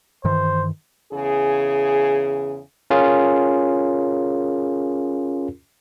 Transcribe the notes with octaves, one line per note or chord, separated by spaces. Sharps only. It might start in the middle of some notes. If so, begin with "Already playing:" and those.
G2 D#3 E3 C5
E2 C#3 G#4
C#4 F4 G#4 A#4